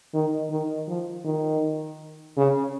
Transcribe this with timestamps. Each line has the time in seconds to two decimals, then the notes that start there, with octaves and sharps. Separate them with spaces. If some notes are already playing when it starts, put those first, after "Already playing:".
0.14 D#3
0.50 D#3
0.88 F3
1.25 D#3
2.37 C#3